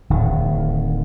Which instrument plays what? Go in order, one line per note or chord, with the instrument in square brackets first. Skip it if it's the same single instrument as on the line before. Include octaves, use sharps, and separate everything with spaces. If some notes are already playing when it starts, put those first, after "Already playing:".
[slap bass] D1 D#3